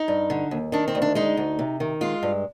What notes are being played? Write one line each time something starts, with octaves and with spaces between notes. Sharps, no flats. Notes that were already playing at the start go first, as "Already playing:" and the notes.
Already playing: D#4
G2
D3
D#2
D#3 D4
C4
D2
D4
G#3 D#4
D2
C3
D#3
G#3 F4
G2